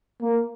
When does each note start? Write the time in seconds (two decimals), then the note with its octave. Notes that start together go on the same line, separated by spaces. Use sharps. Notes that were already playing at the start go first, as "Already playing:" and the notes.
0.22 A#3